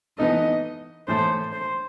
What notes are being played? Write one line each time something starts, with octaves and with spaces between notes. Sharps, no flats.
E3 B3 D#4 A4 D#5
A2 E3 A3 E4 A4 C5
C5